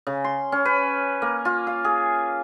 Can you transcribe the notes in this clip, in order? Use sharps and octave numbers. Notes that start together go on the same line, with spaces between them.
C#3
C6
C#4
B4
A#3
F4
F5
G#4